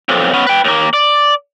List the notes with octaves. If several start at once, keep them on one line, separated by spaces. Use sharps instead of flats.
B1 F2
B3 C#4
B4 G5
D#2 A#3
D5